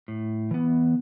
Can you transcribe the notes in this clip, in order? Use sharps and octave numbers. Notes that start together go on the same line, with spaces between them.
A2
E3 B3